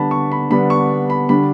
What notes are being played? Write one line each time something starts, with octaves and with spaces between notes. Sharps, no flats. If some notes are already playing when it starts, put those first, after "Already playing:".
Already playing: D3 G3 B3 D4 A5 B5
C#6
B5
D3 G3 B3 D4 B5
C#6
B5
D3 G3 D4 B5